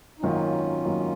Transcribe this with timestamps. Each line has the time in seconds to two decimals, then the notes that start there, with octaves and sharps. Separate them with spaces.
0.19 D#4
0.23 G#1 F#2 D#3 F#3 A#3 C#4 F4
0.85 G#1 F#2 D#3 F#3 A#3